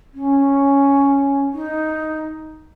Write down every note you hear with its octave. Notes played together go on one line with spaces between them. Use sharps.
C#4
D#4